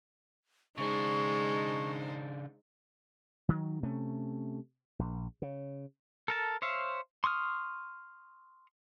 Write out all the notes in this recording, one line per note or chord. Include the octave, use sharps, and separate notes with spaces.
C#3 G#3 D4 D#4 C5 C#6
D#3 F#3
C3 A3 C#4
A#1
C#3
A4 A#4 A5
C5 C#5 E5 F5
C6 C#6 D#6 F6